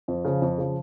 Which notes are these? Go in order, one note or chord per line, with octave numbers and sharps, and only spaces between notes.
F2
C#3 F3
F2
C#3 F3